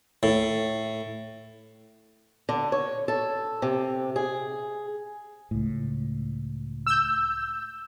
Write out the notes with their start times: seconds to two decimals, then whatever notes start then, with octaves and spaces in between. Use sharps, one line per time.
0.23 A2
2.49 D3
2.72 C#5
3.08 A4
3.62 C3
4.16 G#4
5.51 C#2 A2
6.87 E6 G6